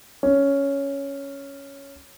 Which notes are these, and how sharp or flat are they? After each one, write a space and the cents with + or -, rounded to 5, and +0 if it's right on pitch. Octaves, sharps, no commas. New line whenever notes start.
C#4 +5